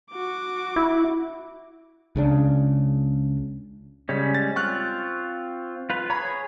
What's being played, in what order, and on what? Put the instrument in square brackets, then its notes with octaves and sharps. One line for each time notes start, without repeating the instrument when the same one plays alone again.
[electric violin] F#4 D6
[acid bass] E4
[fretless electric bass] C#2 C#3 D4
[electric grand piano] C#3 B6 [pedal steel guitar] G3 G#3 C#4
[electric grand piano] A6
[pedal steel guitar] C4 F4 [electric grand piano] C#6 F6 F#6
[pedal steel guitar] F4 B4
[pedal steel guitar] G#4 C#5 [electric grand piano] A#5 B5